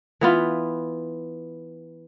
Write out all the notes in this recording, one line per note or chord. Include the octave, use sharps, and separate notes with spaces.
E3 B3 F4